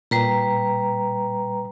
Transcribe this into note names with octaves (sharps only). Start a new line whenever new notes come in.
A#2 G3 B4 A#5